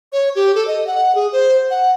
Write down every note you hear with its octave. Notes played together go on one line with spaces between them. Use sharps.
C#5
G4
A4
D#5
F#5
G#4
C5
F#5